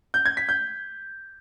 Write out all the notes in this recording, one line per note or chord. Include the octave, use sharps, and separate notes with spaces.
G6
G#6
B6
G6